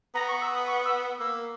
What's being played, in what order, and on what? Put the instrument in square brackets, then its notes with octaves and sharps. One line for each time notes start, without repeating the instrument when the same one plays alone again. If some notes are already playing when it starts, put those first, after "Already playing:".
[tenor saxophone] B3 [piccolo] A#5
[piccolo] C#6
E6
D#6
C#6
E6
[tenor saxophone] A#3 [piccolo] E6